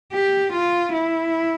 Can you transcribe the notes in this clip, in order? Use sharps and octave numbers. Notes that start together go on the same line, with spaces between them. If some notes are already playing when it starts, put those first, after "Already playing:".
G4
F4
E4